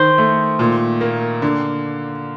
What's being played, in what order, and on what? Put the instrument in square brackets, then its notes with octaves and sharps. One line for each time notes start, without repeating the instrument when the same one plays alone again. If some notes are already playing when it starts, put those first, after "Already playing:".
Already playing: [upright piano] D#3 [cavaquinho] C5
[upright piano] A3
A#2
A#3
D3